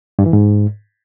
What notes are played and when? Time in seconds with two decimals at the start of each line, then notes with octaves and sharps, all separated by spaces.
0.19 G2
0.26 E3
0.33 G#2